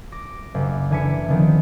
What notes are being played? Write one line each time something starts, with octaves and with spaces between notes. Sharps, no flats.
D6 A#6
F#1
D3 E3 G#5 D6 B6 C#7
D3 D#3 F3 B3 C4